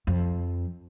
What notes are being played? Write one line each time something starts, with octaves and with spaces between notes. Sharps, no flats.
F2